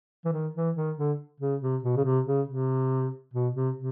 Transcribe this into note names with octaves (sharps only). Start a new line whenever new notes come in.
E3
D#3
E3
D#3
D3
C#3
C3
B2
C#3
C3
C#3
C3
B2
C3
C3